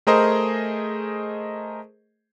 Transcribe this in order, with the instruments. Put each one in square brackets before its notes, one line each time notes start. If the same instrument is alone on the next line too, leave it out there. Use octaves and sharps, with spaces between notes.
[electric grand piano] A3 G#4 A#4 C5 D#5